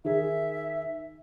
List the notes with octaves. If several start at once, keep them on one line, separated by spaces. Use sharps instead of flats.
D#3 G#4 E5